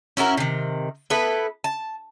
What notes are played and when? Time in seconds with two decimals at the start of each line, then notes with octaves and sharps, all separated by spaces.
0.17 C#4 E4 F#4 A#4
0.37 C3 D#3
1.10 B3 E4 A4 B4
1.64 A5